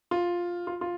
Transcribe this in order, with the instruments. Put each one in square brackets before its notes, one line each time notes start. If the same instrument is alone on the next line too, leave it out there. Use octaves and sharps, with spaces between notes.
[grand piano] F4
F4
F4